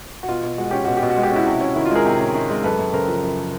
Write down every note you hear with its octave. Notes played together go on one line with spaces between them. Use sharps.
F#4
B2 F4
B2
G#3 F#4
C#4 G4
B2 F#4
G4
B2
F#4
G#3
G4
C#4 E4 F#4
C3
C#4
D#3 E4
F4
G#3 G#4 A#4
C3
C#4
D#3
G#3
F#2 A4 B4
F#2
C#3 A#4 C5
F3
F#2